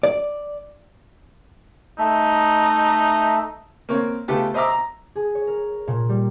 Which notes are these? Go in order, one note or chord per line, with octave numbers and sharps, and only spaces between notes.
D5
A3 D#4 E5
A#3 C4 C#5
C#3 A3 B3 F4 G4 A4
C5 D#5 E5 A#5 D6 E6
A#5
G#4
C#5
A#4
A#2
G3